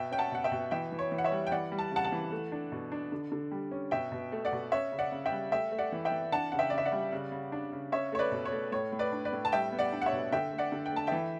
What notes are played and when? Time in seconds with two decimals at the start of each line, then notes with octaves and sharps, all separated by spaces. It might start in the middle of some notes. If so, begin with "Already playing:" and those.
Already playing: B2 E5 G5
0.11 C#4 G5
0.18 F#5 A5
0.32 B2 F#5
0.44 E5 G5
0.52 B2
0.71 E3 E5 G5
0.92 E3
0.99 C#5
1.12 E3
1.18 F#5
1.24 C#5 E5
1.32 G3
1.47 G5
1.52 E3 D5 F#5
1.72 G3
1.79 A5
1.91 C#3 F#5 A5
2.04 F#5 A5
2.12 E3
2.32 A3
2.52 D4
2.72 B2
2.92 D4
3.12 D3
3.32 D3
3.51 G3
3.71 C#4
3.91 B2 E5 G5
4.12 B2
4.32 A3
4.45 D5 F#5
4.53 B2
4.72 C#4 C#5 E5
4.92 C#3
4.99 D5 F#5
5.12 C#3
5.26 E5 G5
5.31 G3
5.51 A3 E5 G5
5.71 A3
5.78 D5 F#5
5.92 E3
6.05 E5 G5
6.12 E3
6.32 D4 F#5 A5
6.52 C#3 F#5
6.59 E5 G5
6.70 C#3 D5
6.78 E5
6.85 D5 F#5
6.92 G3
7.12 C#3
7.32 C#3
7.52 D4
7.72 C#3
7.92 C#4 C#5 E5
8.12 A3 C#5
8.19 B4 D5
8.32 B2
8.45 C#5
8.52 A3
8.72 A2 C#5
8.92 A2
8.99 B4 D5
9.12 D4
9.25 B4 D5
9.32 A2
9.45 A5
9.52 G3 E5 G5
9.72 B3
9.79 D5 F#5
9.92 D4
10.02 F#5
10.06 C#5 E5
10.13 B2
10.32 D3 E5 G5
10.52 A3
10.58 D5 F#5
10.72 D3
10.86 G5
10.92 A3 A5
11.07 E3 E5 G5